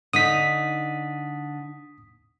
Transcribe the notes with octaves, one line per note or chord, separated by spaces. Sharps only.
D3 D#4 D#6 B6